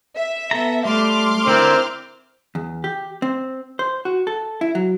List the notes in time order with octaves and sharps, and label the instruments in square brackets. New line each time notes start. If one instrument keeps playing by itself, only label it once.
[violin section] E5
[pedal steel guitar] B3 A4 A#5
[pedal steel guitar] G3 [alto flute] A3 [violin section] C6 D6 F6
[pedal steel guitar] D3 E4 [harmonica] C4 A#4
[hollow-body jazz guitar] E2
G4
C4
C5
F#4
A4
E4
F#3